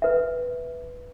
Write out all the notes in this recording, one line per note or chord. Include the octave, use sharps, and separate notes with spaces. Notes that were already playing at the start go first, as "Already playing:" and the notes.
B4 E5